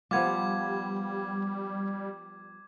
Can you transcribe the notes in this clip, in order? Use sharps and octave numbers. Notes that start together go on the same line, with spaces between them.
F3 G3 B3 F4 D6 G#6